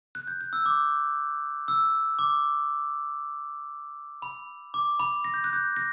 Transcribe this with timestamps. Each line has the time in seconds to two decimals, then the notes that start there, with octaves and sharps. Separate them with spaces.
0.15 F#6
0.27 G6
0.41 F#6
0.53 E6
0.66 D6
1.68 E6
2.19 D6
4.22 B5
4.74 D6
5.00 B5
5.24 A#6
5.34 G6
5.44 F#6
5.53 G6
5.76 A#6